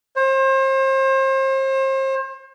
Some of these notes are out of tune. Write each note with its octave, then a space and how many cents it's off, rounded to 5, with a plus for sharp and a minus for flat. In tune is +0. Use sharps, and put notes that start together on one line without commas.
C5 +35